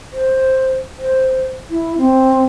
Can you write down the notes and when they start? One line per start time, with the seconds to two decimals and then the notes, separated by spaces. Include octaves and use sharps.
0.13 C5
0.99 C5
1.70 E4
1.98 C4